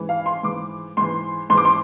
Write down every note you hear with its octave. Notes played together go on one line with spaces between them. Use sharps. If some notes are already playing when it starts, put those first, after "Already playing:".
Already playing: G#2 E3
F5
C6
G#2 E3 D6
G#2 E3 C6
G#2 E3 C6
D6
C6